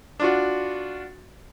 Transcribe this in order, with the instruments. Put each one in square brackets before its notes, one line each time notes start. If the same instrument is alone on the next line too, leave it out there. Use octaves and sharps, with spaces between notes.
[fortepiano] D4 F4 F#4